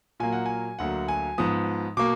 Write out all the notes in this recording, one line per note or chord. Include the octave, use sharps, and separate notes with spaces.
A#2 F#3 A#3 G#5
F#5
G#5
D2 D3 F#3 A#3 F#5
G#5
G#2 F3 B3 D#6
B2 A#3 D6